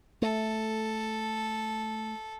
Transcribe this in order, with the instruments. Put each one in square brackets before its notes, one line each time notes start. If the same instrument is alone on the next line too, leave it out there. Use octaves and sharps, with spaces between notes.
[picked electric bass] A3 [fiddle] A4